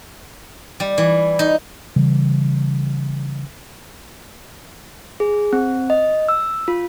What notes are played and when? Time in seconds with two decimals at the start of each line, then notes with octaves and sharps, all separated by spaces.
0.80 G3
0.98 E3
1.39 D#4
1.96 C#3 E3 G3
5.20 G#4
5.53 C4
5.90 D#5
6.29 E6
6.68 F4